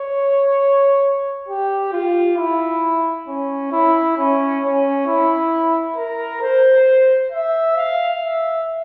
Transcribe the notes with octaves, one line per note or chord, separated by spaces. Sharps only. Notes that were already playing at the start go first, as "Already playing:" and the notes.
Already playing: C#5
G4
F4
E4
C#4
E4
C#4
C#4
E4
A#4
C5
E5
F5
E5